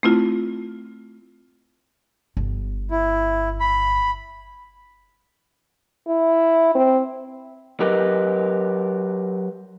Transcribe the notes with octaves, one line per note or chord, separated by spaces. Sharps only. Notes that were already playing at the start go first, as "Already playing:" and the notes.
A3 C4 E4 F4
G1
E4
B5
E4
C4
F#3 G4 A#4 B4 D#5